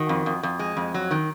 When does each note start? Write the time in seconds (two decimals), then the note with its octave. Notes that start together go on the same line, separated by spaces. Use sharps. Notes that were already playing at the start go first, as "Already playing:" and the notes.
Already playing: D#3 F#4
0.09 F2
0.26 F2
0.43 F2
0.59 G#3
0.76 F2
0.94 F#3
1.11 D#3